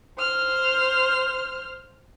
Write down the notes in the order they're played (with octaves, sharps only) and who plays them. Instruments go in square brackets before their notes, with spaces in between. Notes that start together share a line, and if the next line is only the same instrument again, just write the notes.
[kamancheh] C5 F6